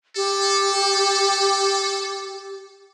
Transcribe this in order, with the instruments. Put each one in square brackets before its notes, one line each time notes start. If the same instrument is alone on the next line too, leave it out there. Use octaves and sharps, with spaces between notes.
[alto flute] G4 [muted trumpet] A4